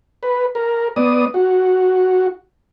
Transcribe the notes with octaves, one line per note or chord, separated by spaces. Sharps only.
B4
A#4
B3 D5 D#6
F#4